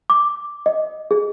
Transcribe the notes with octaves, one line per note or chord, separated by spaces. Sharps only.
D6
D#5
G#4